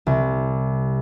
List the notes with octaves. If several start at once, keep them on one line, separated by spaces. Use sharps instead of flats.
C2